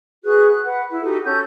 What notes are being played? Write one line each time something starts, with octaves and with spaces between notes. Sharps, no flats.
F#4 G#4 B4 F#6
F#6
B4 F#5
E4
D#4 F#4 G4 A4
C#4 A4 G6